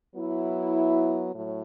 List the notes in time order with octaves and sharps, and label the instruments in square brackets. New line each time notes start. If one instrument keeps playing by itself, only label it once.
[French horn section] F#3 B3 E4
A2 F#3